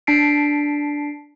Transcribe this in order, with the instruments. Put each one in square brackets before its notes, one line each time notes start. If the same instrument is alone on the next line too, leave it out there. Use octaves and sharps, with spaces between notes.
[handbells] D4 A5 B6 C7 D7